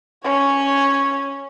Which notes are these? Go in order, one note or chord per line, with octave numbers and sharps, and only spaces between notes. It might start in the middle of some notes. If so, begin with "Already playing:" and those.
C#4 C#5